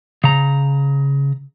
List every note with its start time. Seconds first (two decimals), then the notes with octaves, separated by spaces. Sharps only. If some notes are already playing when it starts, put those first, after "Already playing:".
0.24 C#3 A#5